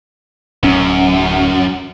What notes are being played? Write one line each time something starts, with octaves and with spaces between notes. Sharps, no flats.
D1 F#2 C#4